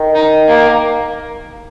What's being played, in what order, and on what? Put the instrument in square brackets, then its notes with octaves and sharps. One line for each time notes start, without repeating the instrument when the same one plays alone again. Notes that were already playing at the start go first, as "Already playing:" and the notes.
Already playing: [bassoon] D#3
[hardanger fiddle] D#4
A#3